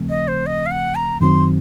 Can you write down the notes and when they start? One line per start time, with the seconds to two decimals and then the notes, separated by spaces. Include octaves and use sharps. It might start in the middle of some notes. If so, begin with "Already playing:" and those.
Already playing: D#2 C#3 F3 A3 C4
0.10 D#5
0.28 C5
0.46 D#5
0.66 F5
0.71 F#5
0.95 A#5
1.21 F#2 D#3 F#3 C4 C6